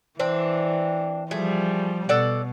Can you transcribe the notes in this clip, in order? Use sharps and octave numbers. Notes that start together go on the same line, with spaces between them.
E3 C4 D4
F3 G3 A3 G#4
B2 A4 D5 F#5